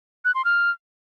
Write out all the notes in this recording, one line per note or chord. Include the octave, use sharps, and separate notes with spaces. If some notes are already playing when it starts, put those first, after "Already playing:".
F#6
C6
F6